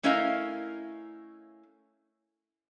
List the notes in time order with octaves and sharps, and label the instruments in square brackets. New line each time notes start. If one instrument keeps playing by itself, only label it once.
[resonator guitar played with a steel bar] A3 C#4 E4 A#4 D#5 F5